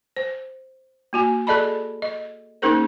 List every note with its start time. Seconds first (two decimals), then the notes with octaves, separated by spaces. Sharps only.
0.16 C5
1.13 A#3 F#4 G#5
1.47 G#4 A4 D5 D#5 A5 B5
2.02 D#5
2.62 A#3 C#4 D#4 G#4 A#4 C5